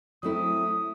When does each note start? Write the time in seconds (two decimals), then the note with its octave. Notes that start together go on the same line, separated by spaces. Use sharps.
0.23 F#3 A3 C4 E4 D#6